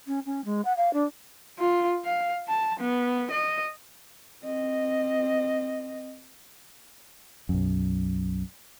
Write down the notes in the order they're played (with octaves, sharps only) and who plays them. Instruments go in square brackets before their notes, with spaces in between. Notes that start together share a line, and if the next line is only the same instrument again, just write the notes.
[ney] C#4
C#4
G#3
F#5
F5
D4
[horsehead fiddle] F4
F5
A5
B3
D#5
C4 D#5
[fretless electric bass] B1 F#2